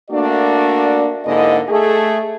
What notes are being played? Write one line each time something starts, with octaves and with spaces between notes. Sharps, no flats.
A3 A#3 D4 F#4 D5
G#2 D3 A#3 E4 D#5
A3 G#4